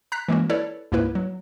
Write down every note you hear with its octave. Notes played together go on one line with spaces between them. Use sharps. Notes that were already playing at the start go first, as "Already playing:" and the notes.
A#5 F#6 B6
E3 G#3 A#3 C#4 F#4
E4 A4 B4 C#5 D5
C#2 G#2 A#3 E4 B4
F#3